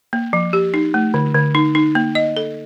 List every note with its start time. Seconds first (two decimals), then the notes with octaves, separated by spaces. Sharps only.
0.13 A#3
0.33 F3
0.53 G4
0.74 D#4
0.94 A3
1.14 D3
1.34 D3
1.55 D#4
1.75 D#4
1.95 A#3
2.15 D#5
2.37 A4